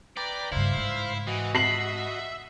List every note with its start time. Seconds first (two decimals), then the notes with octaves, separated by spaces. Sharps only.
0.17 B4 D5 G5 A#5
0.52 G2 C#3 E4 C5 F5
0.77 G#2
1.27 E3 F#4 D#5
1.55 E5 C7 F#7